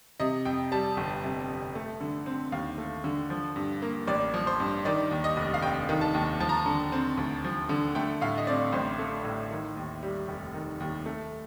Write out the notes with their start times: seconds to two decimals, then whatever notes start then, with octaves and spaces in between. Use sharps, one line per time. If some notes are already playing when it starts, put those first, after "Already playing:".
0.20 C3 D#5
0.45 F2 G5
0.72 G3 A5
0.97 G1
1.23 C3
1.49 F2
1.75 A3
2.01 D3
2.26 C4
2.52 D#2 F5
2.78 A3
3.04 D3
3.30 F3
3.56 G2
3.82 A#3
4.07 A1 D5
4.34 F3
4.47 C5
4.60 G2
4.85 D#3 D5
5.11 D#2
5.24 D#5
5.37 F1
5.54 F5
5.62 F1 G5
5.89 D#3
6.01 A5
6.14 D#2
6.40 F3 A5
6.49 A#5
6.57 A5
6.66 D3
6.92 C4
7.18 D2
7.44 F3
7.69 D3
7.95 A3 G5
8.21 A2 F5
8.38 D#5
8.47 C4 D5
8.73 A1 C5
8.99 A3
9.24 A2
9.51 D#3
9.77 D#2
10.03 G3
10.28 F1
10.54 D#3
10.80 D#2
11.06 A3